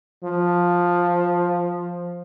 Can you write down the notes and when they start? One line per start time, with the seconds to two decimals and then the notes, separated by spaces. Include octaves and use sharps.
0.23 F3